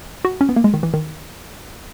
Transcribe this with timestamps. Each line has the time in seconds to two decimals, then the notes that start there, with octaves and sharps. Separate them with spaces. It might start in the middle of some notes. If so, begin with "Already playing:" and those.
0.25 F#4
0.41 C#4
0.49 B3
0.56 A#3
0.64 G#3
0.74 D#3
0.83 E3
0.94 D#3